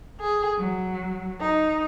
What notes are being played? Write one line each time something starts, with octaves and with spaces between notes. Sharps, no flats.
G#4
F#3
D#4